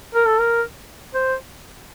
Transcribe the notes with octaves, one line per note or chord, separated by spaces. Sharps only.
A#4
A4
A#4
C5